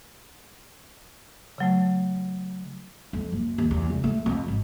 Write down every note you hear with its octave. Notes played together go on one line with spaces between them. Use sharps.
C#3 F#3 A3
F2
F#1
D#2
E2
F1
A3
F2
G#1